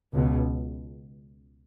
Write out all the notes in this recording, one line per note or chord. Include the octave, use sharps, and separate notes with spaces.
C#2 B2